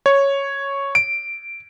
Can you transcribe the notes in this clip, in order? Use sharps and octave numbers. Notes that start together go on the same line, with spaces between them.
C#5
D7